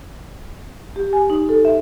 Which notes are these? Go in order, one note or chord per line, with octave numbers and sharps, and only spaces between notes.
G4
G#5
D#4
A4
E5